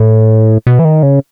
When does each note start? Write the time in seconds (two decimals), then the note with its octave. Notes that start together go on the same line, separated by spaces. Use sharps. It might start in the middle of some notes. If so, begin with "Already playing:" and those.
Already playing: A2
0.67 B2
0.79 E3
0.85 D#3
1.03 C#3